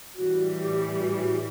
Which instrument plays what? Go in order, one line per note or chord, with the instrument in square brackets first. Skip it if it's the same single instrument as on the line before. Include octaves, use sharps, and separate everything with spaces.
[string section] A2 E3 G3 [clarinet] F#4
[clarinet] G4
F#4
G4
F#4
G4